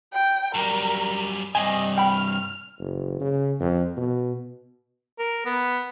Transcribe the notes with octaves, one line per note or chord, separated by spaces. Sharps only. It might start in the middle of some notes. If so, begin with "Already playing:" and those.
G5
F#2 G3 A#4
G2 C3 D#5 G#5
G5 B5 F6
F#1
C#3
F2
B2
A#4
B3